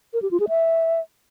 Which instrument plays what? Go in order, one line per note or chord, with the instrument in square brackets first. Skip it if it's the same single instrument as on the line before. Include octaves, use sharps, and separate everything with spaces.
[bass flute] A#4
G4
F4
G#4
E5